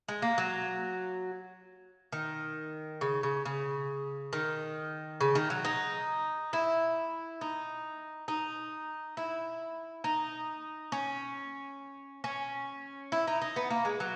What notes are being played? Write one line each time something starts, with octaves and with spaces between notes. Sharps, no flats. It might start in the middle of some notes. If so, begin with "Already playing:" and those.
G#3
A#3
F#3
D#3
C#3
C#3
C#3
D#3
C#3
D#3
F#3
D#4
E4
D#4
D#4
E4
D#4
C#4
C#4
E4
D#4
D#4
B3
A#3
G#3
F#3